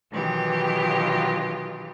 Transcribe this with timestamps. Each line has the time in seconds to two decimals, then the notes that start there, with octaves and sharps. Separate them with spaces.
0.13 B2 D#3 E3 F#3 F4 G4